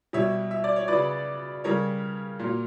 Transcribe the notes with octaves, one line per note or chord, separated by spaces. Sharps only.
B2 G3 C#5 E5
E5
D5
C#5
C#3 F#3 B4 D5
C#3 G3 A#4 C#5
A#2 F#3